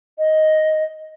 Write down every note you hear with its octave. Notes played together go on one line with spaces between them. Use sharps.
D#5